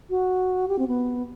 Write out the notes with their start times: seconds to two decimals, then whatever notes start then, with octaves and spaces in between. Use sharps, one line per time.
0.10 F#4
0.68 G4
0.79 C4
0.88 B3